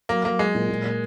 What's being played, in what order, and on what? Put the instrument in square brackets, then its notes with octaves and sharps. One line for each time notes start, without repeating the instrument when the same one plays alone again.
[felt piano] F#3 [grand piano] A#3
[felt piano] F#3 [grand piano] A#3
[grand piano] G#3 [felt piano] G#4
[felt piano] A#2
A#2
A#3